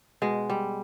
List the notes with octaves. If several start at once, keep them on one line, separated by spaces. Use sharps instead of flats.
B2 G#3
G3